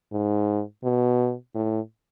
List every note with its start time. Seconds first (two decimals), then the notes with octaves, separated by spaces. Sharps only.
0.12 G#2
0.84 B2
1.55 A2